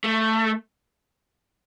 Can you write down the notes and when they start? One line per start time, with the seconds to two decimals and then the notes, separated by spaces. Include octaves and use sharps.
0.04 A3